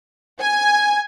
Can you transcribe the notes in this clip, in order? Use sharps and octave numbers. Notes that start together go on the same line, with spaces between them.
G#5